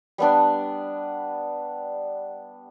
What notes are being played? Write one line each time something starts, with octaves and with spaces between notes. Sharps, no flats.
G3 B3 D4